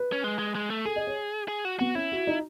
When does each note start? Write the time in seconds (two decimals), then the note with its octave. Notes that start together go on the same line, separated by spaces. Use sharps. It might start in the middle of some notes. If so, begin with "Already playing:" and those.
Already playing: B4
0.12 C#4
0.24 G#3
0.39 G#3
0.55 G#3
0.70 A3
0.86 G#4 A4
0.96 D#5
1.07 C#5
1.48 G#4
1.65 F#4
1.79 B3 F#4
1.95 C#4 E4
2.12 F#4
2.27 D#4